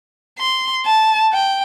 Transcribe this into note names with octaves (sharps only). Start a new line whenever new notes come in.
C6
A5
G5